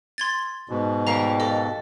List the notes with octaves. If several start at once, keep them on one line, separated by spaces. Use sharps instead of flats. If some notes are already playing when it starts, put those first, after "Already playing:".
C6 G#6 A6
G#2 B2
G3 A#3 F5 A#5
A4 D#5